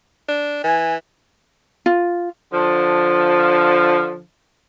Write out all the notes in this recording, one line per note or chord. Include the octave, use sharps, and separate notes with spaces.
D4
E3 G#5
F4
D3 F3